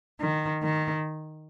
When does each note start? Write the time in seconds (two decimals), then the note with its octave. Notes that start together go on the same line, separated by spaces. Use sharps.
0.19 D#3
0.62 D#3